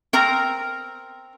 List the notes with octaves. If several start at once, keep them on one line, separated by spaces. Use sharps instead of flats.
C4 A#4 A#5